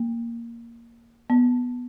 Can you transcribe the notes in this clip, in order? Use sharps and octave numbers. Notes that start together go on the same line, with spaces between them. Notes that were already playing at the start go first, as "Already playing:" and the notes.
Already playing: A#3
B3